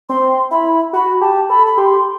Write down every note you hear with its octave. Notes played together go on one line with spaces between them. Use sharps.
C4 C6
E4 B5
F#4 B5
G4 A5
A4 B5
B5
G4 C6